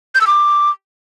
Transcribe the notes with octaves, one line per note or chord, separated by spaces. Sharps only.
G6
E6
D6